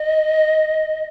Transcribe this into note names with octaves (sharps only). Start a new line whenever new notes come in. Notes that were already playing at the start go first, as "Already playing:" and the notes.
Already playing: D#5